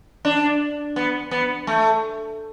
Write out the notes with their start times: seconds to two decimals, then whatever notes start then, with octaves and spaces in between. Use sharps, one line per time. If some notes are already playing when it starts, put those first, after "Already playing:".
0.25 D4
0.96 B3
1.31 B3
1.67 A3